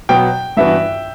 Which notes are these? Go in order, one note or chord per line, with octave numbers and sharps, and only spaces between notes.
B2 F#3 B3 G5
G2 E3 B3 F#4 B4 E5